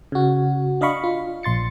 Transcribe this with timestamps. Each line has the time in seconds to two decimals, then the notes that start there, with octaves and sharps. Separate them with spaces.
0.12 C#3 F#4
0.81 D4 D#5 F5 B5 C#6
1.04 F4
1.43 A#1 C6 A6 C#7